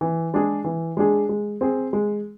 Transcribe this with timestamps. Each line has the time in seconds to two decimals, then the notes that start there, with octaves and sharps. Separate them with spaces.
0.01 E3
0.34 G#3 D4 G#4
0.64 E3
0.97 G#3 D4 G#4
1.29 G#3
1.61 C4 G#4
1.93 G#3